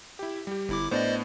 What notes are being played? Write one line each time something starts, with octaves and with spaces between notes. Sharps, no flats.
E4 G4
G3 G4
G1 E4 D6
A2 B3 D4 C5 D5 D#5